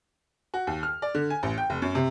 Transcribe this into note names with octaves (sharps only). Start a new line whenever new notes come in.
F#4
D#2
F6
D5
D3
G#5
A1
G5
F1
F#2
C3